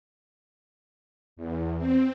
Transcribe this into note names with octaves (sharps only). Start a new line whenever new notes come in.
E2
C4